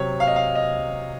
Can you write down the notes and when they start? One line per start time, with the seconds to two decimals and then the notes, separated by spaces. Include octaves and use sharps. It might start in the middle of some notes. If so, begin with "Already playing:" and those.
Already playing: C3 F#3 C#5
0.20 F5
0.27 D#5
0.36 F5
0.55 D#5